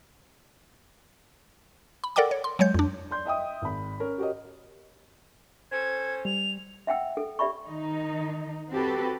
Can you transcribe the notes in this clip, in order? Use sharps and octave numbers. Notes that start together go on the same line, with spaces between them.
B5
A4 A#4 D5 F#5 G5 D6
C#5
C6
F#3 G#3 C#5 G6
F2 D4
D5 C6 G6
D#5 E5 G5 D#6
G#1 B5
C#4 A#4
F#4 G4 A#4 C#5 D#5
C#4 A4 C5 G#6
G3 F7
E5 F#5 G5 E6
A4
G4 D5 E5 B5 C#6
D#3 D#4
C4 F#4 G4 A4 B4